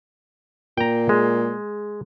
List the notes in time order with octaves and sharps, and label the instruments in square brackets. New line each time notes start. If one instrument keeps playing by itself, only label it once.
[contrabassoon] A#2 [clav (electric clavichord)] G5 A#5
[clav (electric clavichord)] G#3